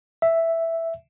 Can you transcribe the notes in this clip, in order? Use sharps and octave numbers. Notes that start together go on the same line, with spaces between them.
E5